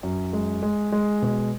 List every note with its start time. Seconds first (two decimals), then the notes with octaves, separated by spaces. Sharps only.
0.03 F#2
0.33 G#3
0.63 G#3
0.92 G#3
1.22 B2